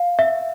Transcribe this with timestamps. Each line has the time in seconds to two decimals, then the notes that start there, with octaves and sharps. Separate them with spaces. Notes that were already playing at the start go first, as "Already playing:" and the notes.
Already playing: F5
0.19 E5